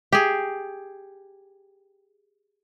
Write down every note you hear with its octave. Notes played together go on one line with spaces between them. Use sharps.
G4 G#4